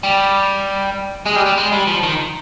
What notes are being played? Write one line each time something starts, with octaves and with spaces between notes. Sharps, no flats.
G3
G#3
G3
G3
G#3
G3
F3
D#3